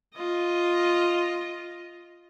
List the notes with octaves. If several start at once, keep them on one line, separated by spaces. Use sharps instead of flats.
F4 D#5